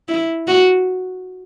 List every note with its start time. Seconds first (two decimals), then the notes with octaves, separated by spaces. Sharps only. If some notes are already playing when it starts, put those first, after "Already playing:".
0.09 E4
0.47 F#4